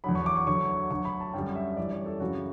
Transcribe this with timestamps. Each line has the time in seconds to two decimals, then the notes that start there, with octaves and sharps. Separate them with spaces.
0.04 E2 D3 F#3 B5
0.15 C#6
0.26 D6
0.36 C#6
0.47 D2 D3 F#3 C#6
0.91 D2 D3 F#3 C#6
1.05 B5
1.20 A5
1.34 F#2 D3 G3 G5
1.55 E5
1.77 F#2 E3 G3 D5
1.91 C#5
2.06 A4
2.20 F#2 C#3 E3 F#4